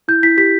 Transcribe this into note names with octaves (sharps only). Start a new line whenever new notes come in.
E4 G6
E4 B6
G4 B6